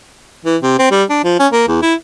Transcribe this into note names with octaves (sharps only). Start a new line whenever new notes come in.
E3
C3
C4
G3
D4
F3
C#4
A#3
E2
E4